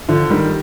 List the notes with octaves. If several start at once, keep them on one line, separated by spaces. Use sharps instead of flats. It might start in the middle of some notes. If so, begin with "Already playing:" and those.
D3 F3
D#3 G3